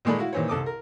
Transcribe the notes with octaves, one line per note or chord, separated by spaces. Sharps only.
A#2 D#3 G#3 A3 D5 B5
E4 F#4 F5
A#2 D#3 E3 C5 C#5
C2 A4 D6 D#6
A#4